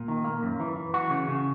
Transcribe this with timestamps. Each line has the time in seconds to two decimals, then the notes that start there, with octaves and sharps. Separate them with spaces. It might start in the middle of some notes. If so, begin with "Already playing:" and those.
Already playing: A#2
0.08 D#3
0.24 A#3
0.43 F#2
0.60 E3
0.76 E3
0.94 F#4
1.11 C#3
1.28 C#3